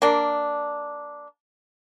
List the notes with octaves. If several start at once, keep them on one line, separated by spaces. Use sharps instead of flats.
A#3 D4